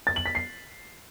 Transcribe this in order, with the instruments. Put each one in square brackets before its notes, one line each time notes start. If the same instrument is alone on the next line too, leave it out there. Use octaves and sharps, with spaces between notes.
[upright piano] A6
F#7
B6
C7